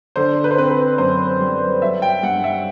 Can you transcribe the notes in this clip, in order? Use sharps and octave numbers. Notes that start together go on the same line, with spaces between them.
D3 C5
B4
C5
C4 B4
B4
F#2 C5
G3
F#3 E5
G5
G2 F#5
E5